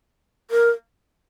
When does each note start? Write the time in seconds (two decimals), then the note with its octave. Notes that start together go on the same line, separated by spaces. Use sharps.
0.51 A#4